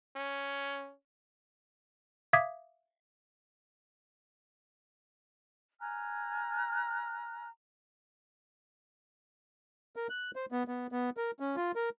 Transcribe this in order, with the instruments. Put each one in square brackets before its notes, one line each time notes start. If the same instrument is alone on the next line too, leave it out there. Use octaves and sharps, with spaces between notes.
[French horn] C#4
[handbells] E5 F5 D6 D#6 G#6 B6
[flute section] G#5 A#5 F6 F#6
[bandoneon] A#4
F#6
C5
B3
B3
B3
A#4
C#4
F4
A#4